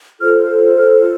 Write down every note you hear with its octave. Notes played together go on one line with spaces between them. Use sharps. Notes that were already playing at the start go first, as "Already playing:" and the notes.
F4 A4 C5 F6
F6